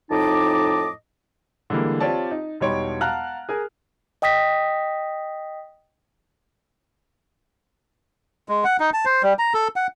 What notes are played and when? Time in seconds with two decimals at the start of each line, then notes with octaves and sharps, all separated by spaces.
0.11 F2 A2 D#4 D#5 A5 D6
1.70 D3 E3 G3 G#3 A#3
2.01 C4 F4 G4 C#5 D5 A5
2.31 D#4
2.60 E1 G3 D#4 C#5 C6 D7
3.01 F5 F#5 A5 A#5 F6 F#6
3.49 G#4 A#4 G#5
4.22 D#5 G5 D#6 A#6 B6
8.49 G#3
8.64 F#5
8.80 D#4
8.94 A5
9.05 C5
9.23 G3
9.39 A#5
9.54 A4
9.76 F#5